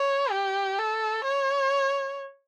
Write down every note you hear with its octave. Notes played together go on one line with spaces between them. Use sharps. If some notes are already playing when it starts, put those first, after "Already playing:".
Already playing: C#5
G4
A4
C#5